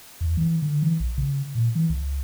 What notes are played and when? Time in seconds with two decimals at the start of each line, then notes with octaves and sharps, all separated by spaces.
0.21 E2
0.37 E3
0.62 D3
0.82 E3
1.00 A#1
1.18 C#3
1.55 A#2
1.75 E3
1.90 C#2